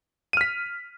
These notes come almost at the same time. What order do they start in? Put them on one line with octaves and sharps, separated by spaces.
D#7 F6 B6